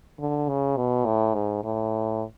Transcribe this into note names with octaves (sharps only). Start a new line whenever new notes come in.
D3
C#3
B2
A2
G#2
A2